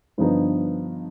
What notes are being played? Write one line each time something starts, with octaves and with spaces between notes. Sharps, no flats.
G2 D3 F3 B3 D#4